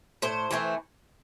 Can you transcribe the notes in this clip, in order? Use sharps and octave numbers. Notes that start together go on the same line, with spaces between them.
A2 C5
E3 A3 C4